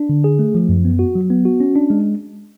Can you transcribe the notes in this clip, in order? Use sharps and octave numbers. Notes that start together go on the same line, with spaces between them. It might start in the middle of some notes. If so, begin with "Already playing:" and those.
Already playing: D4
D3
G#4
A3
F3
F#2
B3
F#4
F#3
B3
F#4
C#4
D4
G#3